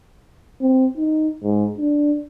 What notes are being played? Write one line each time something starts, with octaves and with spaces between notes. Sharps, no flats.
C4
D#4
G#2
D4